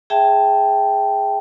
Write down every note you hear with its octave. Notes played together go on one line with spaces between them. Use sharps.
G#4 E5 G5 A5